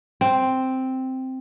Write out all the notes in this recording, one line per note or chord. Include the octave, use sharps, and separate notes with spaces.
C4